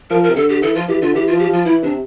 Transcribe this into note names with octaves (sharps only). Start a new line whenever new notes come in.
F3 A#4
A#4
C3
D3 A4
G4
E3 A4
F3 F4
E3 G4
D3 F4
E3 G4
F4
F3
G4
F3
F4
E3 E4
C3 D4